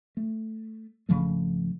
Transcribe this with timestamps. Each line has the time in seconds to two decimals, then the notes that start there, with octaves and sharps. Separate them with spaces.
0.17 A3
1.09 G#1 C#3 F3 A3